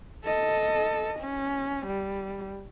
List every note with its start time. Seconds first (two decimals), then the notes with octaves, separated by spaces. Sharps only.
0.25 A4 D#5
1.20 C#4
1.87 G3